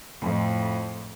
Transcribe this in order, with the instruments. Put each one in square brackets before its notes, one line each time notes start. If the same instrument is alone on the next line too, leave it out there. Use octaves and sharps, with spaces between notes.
[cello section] F2 A2